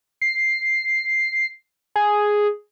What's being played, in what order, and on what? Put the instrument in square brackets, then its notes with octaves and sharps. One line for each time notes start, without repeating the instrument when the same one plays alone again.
[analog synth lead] C7
G#4